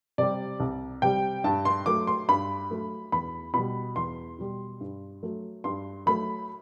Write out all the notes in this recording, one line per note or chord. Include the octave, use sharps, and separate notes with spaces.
C3 G3 D5
C2
C3 G3 G5
G2 A5
C6
F#3 A3 D6
C6
G2 B5
F#3 A3
E2 B5
B2 G3 B5
E2 C6
B2 G3
G2
F#3 A3
G2 C6
F#3 A3 B5